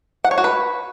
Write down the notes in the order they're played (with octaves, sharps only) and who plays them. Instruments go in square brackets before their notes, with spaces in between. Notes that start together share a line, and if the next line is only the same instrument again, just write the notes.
[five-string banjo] F#5
C#5
F#4
B4